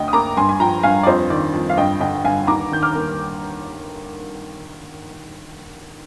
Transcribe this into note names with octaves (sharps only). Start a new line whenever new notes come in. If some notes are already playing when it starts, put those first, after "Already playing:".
Already playing: D2 D3 D#5 G5
D#6
A#3 A#5 D6
G2 G#5 C6
G#5
F3 G5 A#5
G2 F5 G#5
D5
F2 C5 D#5
D#3 D5
F2
F5
G2 D#5 G5
D3 D#5 G5
G5
G2 F5 G#5
D#2 A#5 D6
D#3 G6
D6 F6
A#3